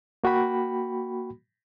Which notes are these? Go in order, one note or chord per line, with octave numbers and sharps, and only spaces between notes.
A#3 F#4 G5 B5